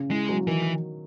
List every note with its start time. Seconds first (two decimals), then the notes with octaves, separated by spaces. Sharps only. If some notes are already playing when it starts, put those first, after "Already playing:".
Already playing: C#3
0.11 G#3 E4
0.29 F#3
0.47 D#3 E3